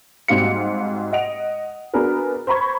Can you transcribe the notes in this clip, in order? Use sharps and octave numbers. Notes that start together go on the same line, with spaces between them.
G#2 G3 C4 F#4 F5 C#7
D#5 F#5 D7 F7
B3 D4 F#4 G#4 A#4 B4
C5 A#5 B5 C#6 G#6